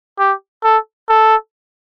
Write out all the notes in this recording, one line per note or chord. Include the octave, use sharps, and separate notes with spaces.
G4
A4
A4